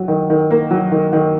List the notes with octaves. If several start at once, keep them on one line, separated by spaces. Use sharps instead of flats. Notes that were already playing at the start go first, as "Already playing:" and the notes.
Already playing: F#3
D#3
D#3
A#3
F#3
D#3
D#3